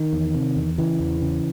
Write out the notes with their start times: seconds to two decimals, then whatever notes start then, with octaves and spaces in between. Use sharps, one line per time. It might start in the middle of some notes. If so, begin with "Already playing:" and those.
Already playing: D#3
0.13 E2
0.35 C3
0.56 E2
0.78 C#3 E3
1.00 E2
1.22 C#3